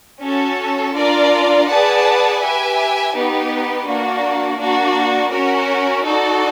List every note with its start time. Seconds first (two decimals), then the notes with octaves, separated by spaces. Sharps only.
0.21 C#4 F#4 A4
0.94 D4 F4 A#4 D5
1.67 G#4 B4 D5 F#5 A5
2.41 G4 B4 E5 G#5
3.13 B3 D#4 G4 B4
3.85 A#3 D4 F#4
4.58 A#3 D4 F#4
5.31 C#4 F#4 A#4
6.05 D#4 F#4 A4 D5